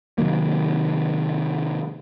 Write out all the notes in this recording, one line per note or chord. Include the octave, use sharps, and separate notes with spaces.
C3 D#3 F#3 A#3